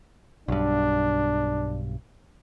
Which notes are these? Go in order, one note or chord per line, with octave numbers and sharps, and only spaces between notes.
B1 G2 D4